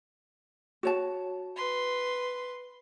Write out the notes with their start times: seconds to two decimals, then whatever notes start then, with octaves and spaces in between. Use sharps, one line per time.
0.83 F#4 C#5 A5
1.56 B4 C6